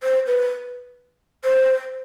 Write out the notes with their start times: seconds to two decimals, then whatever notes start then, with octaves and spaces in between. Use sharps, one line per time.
0.03 C5
0.27 B4
1.44 C5